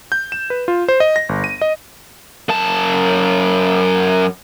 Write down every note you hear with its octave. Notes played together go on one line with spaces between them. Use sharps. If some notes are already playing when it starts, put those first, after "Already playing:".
G6
E7
B4
F4
C5
D#5
A#6
G1
D#7
D#5
F#2 A5